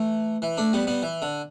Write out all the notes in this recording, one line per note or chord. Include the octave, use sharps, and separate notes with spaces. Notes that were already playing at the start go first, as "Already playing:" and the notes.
Already playing: E3 A3
E3
A3 D4
G3 B3
G3 B3
E3
D3